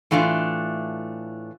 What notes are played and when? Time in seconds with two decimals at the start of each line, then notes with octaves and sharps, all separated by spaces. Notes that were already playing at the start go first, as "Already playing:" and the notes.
0.11 A2 E3 A3 D4 F4